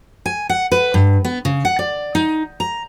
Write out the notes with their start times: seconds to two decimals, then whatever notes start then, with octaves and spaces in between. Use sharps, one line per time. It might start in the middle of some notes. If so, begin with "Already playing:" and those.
0.26 G#5
0.49 F#5
0.72 B4
0.94 G2
1.25 B3
1.45 C#3
1.65 F#5
1.79 D5
2.15 D#4
2.60 A#5